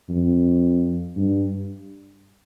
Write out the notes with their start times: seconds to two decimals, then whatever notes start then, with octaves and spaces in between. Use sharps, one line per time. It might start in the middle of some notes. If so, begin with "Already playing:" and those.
0.09 F2
1.17 G2